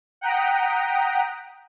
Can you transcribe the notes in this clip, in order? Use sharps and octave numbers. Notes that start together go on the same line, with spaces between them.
F#5 G5 A#5 D#6 B6 D7